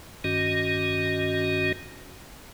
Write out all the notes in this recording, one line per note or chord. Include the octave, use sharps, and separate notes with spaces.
G2 D#3 C#4 F#4 D#5